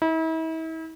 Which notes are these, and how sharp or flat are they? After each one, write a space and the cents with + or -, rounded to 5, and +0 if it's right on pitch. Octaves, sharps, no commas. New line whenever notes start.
E4 -40